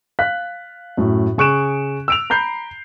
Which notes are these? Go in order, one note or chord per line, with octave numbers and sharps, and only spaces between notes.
F5 F#6 B6
F#2 A2
C#3 G#4 C#6 F#6 D7 E7
E6 D7 F7
A#5 B5 G6 C7